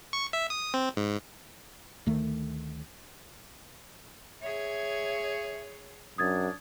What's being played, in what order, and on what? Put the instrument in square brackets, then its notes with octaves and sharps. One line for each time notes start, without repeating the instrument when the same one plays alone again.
[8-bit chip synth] C#6
E5
D#6
C4
G#2
[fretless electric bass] D2 D#3 A3
[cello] G#4 C#5 [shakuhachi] E5
[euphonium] F#2 [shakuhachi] D4 [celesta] D#6 G#6 A6